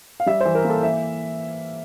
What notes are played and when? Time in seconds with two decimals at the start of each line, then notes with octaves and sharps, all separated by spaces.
0.20 F5
0.26 G3 E5
0.40 E3 C5
0.55 A#4
0.64 A#3
0.70 A4
0.83 E3 E5